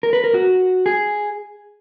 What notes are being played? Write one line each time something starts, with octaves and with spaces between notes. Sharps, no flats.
A#4
B4
A#4
F#4
G#4